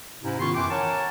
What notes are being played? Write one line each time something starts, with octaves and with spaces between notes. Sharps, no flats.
G#2 C3 C#4 D#4 E4
D#3 B3 C#4 F4 C6 C#6
F#2 E3 B4 G5 D6
A#4 C#5 F#5 G#5 A5